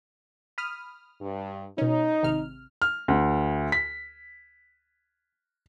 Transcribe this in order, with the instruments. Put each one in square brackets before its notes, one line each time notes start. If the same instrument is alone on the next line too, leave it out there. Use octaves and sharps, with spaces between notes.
[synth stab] B5 D#6 F6
[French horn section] G2
[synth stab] B2 C#4 [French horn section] D#4
[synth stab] G#1 C3 F6
[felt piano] F6
D2
B6